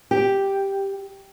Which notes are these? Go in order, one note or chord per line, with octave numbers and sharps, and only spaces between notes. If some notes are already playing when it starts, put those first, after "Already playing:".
G4